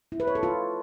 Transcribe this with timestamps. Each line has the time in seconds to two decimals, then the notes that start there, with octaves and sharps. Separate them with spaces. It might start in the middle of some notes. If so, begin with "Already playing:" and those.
0.12 E4
0.20 B4
0.27 C#5
0.35 A4
0.43 F4